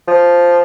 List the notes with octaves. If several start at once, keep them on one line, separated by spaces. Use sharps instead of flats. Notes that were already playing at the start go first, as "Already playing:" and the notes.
F3